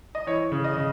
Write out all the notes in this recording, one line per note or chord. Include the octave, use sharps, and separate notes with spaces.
D#5
E3 C#5
C#3
D#5
C#3